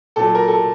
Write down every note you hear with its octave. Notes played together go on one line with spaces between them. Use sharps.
A#2 F#3 A4
A#4
A4